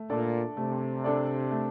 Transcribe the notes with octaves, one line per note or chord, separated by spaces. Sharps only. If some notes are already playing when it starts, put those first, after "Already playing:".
Already playing: A3
A#2 D4 A4 D5
C3 A3
D4 A4 D5
A3